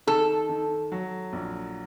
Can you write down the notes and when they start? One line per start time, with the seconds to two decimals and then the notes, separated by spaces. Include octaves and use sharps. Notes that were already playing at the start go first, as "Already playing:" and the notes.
0.07 D#3 A4
0.49 D#3
0.92 F#3
1.33 A#1